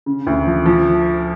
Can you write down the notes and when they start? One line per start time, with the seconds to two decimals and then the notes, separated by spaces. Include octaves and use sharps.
0.06 C#3
0.27 D2
0.46 F3
0.66 F3